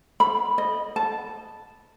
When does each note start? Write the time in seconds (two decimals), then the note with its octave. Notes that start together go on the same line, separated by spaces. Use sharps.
0.20 B5
0.58 D#5
0.96 A5